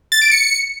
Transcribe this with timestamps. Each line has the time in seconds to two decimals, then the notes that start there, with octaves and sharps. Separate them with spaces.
0.12 A6
0.22 D7
0.31 C#7